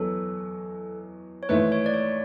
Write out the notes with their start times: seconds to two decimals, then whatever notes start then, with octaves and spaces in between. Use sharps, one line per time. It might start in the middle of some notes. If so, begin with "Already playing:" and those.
Already playing: E2 B2 F#3 A4
1.43 C#5
1.49 G#1 G#2 E3 A3 B4
1.72 C#5
1.86 D5
1.94 C#5